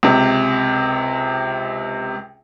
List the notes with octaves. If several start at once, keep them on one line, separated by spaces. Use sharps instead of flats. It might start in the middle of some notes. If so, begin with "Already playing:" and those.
C#2 C3